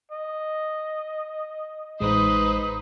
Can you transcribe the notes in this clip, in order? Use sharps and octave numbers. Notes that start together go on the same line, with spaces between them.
D#5
A1 G#3 D#4 B4 C5 D#6